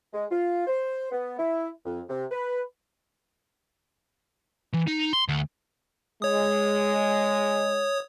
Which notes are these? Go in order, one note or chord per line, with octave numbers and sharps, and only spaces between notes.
G#3
F4
C5
B3
E4
F2
C3
B4
E3
D#4
C6
D2
G#3 C#5 D#6